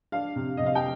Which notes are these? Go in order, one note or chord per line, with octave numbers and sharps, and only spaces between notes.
D4 F5
C3
C3 D#5
F5
G5